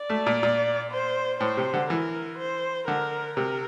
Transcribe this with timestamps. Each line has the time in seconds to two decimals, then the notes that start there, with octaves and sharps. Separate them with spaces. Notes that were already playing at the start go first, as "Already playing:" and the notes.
Already playing: D5
0.10 A3
0.26 A#2
0.43 A#2
0.91 C5
1.41 A2 C5
1.57 C3
1.74 D3
1.90 E3 A#4
2.39 C5
2.88 D3 A#4
3.37 C3 A#4